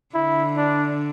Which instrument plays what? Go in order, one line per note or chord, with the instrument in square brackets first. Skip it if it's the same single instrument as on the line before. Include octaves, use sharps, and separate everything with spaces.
[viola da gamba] D3 [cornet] E4
[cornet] D4